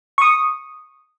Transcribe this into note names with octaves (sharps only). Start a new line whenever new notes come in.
C#6 D#6